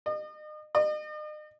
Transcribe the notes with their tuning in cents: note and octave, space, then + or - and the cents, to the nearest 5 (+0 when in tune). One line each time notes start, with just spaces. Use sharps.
D#5 -35
D#5 -40